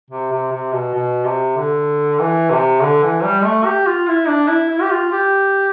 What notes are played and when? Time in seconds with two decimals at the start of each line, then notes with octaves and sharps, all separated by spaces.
0.10 C3
0.32 C3
0.52 C3
0.73 B2
0.94 B2
1.25 C3
1.57 D3
2.20 E3
2.51 C3
2.82 D3
3.03 E3
3.24 G3
3.44 A3
3.65 G4
3.86 F4
4.07 E4
4.28 D4
4.48 E4
4.70 E4
4.81 G4
4.91 F4
5.12 G4